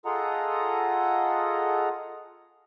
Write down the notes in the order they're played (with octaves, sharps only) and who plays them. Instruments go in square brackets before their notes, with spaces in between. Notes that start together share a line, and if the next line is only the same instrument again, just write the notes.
[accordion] F4 G#4 A4 D#5 F#5 A#5